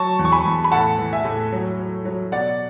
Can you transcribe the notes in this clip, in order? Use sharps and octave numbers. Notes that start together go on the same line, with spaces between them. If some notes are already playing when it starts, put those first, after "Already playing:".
Already playing: F#3 A5 C#6
E2
C#6
G#5 B5
E2
B5
A2 F#5 A5
E3
E5 G#5
A2
F#3
F#3
F#3
B2 D5 F#5